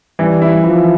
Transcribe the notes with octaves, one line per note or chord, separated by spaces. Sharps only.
E3 G3
E4
E3 F3